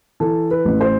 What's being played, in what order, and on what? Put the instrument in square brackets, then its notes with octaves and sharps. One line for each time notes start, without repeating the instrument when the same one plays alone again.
[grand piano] E3 A4
B4
A1
C5